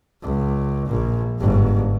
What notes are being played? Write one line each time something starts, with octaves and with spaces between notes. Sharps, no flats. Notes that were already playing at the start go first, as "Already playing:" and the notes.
C#2
A#1 A#2
G1 G#2